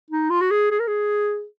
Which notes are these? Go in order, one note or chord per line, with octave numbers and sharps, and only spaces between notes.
D#4
F4
F#4
G#4
G#4
A#4
G#4